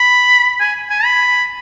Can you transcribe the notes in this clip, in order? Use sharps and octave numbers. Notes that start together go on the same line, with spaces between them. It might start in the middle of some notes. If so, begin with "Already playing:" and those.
Already playing: B5
G#5
G#5
B5